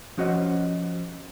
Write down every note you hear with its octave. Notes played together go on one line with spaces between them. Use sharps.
F3 C#4 F#4 C5 D#5